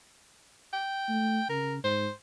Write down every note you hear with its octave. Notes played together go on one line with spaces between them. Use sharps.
G5
A3
C#3 A#4
G#2 C5